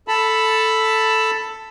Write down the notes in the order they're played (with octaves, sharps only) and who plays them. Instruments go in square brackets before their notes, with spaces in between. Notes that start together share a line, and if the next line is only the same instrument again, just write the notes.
[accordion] A4 A5 B5